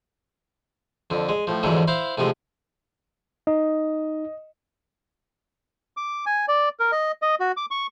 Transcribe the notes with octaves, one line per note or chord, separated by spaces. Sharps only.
F2 D3
G#3
A2 F3
F2 G#2 D3 E3 F#3
E4 C5 F5
A2 C3 F3 G#3
D#4 D#5
D6
G#5
D5
A#4
D#5
D#5
F#4
D6
C#6